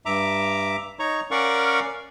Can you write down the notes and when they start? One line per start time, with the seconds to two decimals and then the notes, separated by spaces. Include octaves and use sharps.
0.06 G2 E5 A#5 D6
0.99 D#4 C#5 A#5 C#6
1.31 C#4 A#4 D5 F5 F#5 C#6